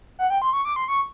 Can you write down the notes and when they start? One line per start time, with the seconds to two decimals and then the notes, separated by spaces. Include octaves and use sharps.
0.19 F#5
0.30 G5
0.42 C6
0.53 C#6
0.65 D6
0.76 C6
0.88 C#6